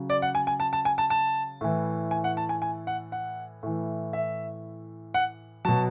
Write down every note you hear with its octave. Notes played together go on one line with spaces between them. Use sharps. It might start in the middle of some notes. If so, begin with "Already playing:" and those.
Already playing: C#3 F#3
D5
F#5
G#5
G#5
A5
A5
G#5
A5
A5
A2 E3
G#5
F#5
A5
G#5
G#5
F#5
F#5
A2 E3
E5
F#5
B2 F#3 A5